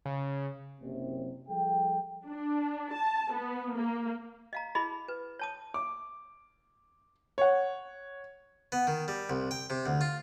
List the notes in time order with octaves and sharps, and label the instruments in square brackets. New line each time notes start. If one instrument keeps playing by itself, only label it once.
[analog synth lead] C#3
[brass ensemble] F#1 C3
F3 G3 G#4 A4 G5
[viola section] D4
A5
B3
A#3
[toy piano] D#5 F5 A#5
E4 G#4 D#5 B5
B4
C#5 A5 D#6
[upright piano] D6
C#5 F#5
[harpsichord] B3
D#3
G3
C2
G5
C3
D2
F4